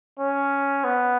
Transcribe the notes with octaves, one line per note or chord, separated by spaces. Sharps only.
C#4
B3